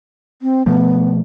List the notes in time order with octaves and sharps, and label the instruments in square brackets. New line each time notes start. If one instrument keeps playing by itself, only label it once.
[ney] C4
[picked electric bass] B2 F3 A3 [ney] B3